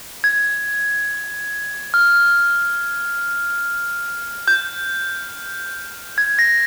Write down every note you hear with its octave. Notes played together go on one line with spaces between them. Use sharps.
G#6
F6
G6
G#6
A#6